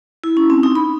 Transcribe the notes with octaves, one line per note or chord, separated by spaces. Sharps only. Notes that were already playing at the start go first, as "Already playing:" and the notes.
E4
C#4
C4
D#4
B5